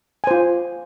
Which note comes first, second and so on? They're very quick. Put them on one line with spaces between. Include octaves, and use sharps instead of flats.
G#5 C5 F4